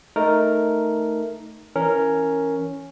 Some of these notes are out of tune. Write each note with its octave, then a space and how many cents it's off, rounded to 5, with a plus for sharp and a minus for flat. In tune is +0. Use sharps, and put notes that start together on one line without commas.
A3 +0 D#4 +0 A#4 +0
E3 +0 C#4 +0 A#4 -5